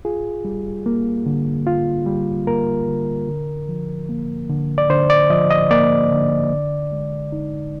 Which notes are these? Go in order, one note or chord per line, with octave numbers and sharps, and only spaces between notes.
F4 G#4
G3
A#3
D3
F4
G3
A#3 A#4
D3
D3
F3
A#3
D3
D5
D3 C5
D5
F3 D#5
D#5
A#3 D5
D3
D3
G#3
D#4